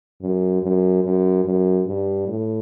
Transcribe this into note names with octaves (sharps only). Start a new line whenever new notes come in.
F#2
F#2
F#2
F#2
G2
A2